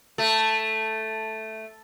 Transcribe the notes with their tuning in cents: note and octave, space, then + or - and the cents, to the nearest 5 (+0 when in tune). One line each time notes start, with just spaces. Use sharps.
A3 +0